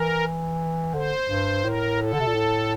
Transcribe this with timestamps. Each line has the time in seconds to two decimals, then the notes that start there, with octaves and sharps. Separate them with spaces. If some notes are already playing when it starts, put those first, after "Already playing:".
Already playing: E3 A#4
0.94 D3 C5
1.28 G2
1.63 A2 A#4
1.99 A4
2.13 D3
2.20 C3
2.27 A#2
2.34 A2